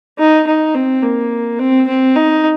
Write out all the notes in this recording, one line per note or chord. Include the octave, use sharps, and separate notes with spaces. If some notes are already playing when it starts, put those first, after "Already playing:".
D#4
D#4
C4
A#3
C4
C4
D#4